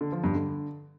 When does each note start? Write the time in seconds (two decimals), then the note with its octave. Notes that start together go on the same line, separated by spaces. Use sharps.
0.01 D3
0.12 F3
0.24 G2
0.35 D3